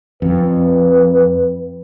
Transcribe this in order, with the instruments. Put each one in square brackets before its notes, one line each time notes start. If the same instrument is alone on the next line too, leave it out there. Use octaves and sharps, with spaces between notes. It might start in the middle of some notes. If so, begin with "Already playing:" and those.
[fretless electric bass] F2 [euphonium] B4